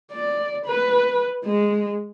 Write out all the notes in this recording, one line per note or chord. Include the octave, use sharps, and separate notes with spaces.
D5
B4
G#3